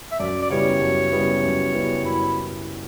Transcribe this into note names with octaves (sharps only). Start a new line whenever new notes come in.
E5
F#2 D5
D5
C#3 G3 B3 E4 C#5
F#2
C#3 G3 B3 E4
F#2
C#3 G3 B3 E4
F#2 E4